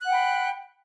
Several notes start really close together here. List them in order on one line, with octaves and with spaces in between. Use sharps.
F#6 F#5 G5 B5